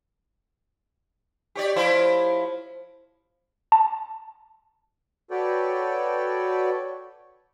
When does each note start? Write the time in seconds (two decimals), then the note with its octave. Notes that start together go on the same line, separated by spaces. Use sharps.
1.55 G4 C#5 D5
1.76 F3 E4 C5
3.72 A5
5.31 F#4 A4 B4 C#5 D5 G5